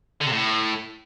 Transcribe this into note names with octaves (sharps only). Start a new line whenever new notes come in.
D3
C3
A2